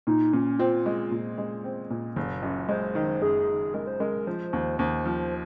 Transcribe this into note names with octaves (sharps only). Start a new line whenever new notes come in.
A#2 D#4
A#2 C#4
C4 F4
G#3
A#2
G#3
C4
A#2
F#1
F#2
G#3 C5
D#3
F#2 G#4
D#3
G#3 A#4
C5
G#3 A#4
F3 C5
D#2
D#2 C5
F3